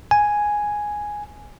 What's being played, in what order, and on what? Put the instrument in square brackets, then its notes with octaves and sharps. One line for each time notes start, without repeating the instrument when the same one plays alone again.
[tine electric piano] G#5